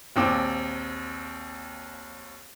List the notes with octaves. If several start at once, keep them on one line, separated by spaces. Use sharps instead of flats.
A#1 D#2 C4 D6